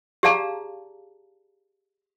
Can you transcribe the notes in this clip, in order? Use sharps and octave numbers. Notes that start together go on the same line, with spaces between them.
G4 G#4 D5 F5 A5 A#5